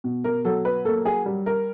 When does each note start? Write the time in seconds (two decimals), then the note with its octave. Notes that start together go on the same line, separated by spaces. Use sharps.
0.04 B2
0.24 A#4
0.45 F#3 A4
0.65 B4
0.85 A#3 A4
1.05 G#4
1.26 G3
1.46 A#4